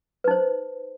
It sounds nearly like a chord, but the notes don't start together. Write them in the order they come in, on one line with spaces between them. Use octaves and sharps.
B4 D#4 C5